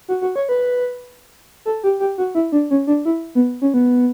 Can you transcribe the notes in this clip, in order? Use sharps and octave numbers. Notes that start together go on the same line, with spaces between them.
F#4
F#4
C#5
B4
A4
G4
G4
F#4
E4
D4
C#4
D4
E4
B3
C#4
B3